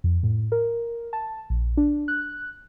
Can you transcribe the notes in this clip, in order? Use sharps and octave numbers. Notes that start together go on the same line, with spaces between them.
F2
A2
A#4
A5
A#1
D4
F#6